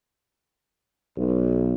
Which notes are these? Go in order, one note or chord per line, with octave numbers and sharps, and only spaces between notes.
B1